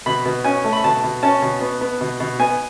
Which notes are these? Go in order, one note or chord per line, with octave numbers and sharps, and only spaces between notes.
B2 B5
B2
C#4 G#5
A3
B5
B2 A5
B2
C#4 A5
B2
B3
B3
B2
B2
B3 G#5